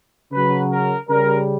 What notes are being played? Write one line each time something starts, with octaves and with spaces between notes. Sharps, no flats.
C#3 F#3 B4
A#4
C#3 G3 A#4